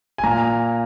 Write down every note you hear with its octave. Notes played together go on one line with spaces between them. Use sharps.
G#5
A#2 A#5